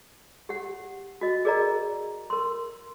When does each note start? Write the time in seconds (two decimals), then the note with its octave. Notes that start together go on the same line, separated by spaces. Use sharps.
0.49 G4 F#5
1.21 F#4 D#5
1.45 G#4 A#4 D5 D#5 A#5
2.30 A#4 C6